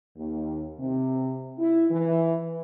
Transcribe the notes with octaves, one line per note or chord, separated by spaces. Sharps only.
D#2
C3
E4
E3